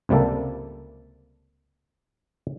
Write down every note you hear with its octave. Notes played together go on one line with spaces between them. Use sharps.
C#2 C3 G3 A#3 A4